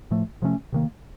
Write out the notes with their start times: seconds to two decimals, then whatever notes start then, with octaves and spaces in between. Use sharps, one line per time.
0.11 A2 F3 A3
0.42 C3 F3 A3 C#4
0.72 C3 D#3 A#3